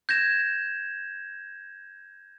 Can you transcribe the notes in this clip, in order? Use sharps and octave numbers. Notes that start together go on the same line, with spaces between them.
G6 G#6 A#6 E7